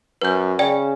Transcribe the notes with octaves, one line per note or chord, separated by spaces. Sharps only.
F#2 B4 G6
C#3 D5 G5